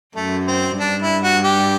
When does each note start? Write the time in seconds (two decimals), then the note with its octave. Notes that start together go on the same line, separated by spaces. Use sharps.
0.15 F#2 A3
0.48 C4
0.80 G2 D4
1.02 E4
1.23 F#4
1.44 G4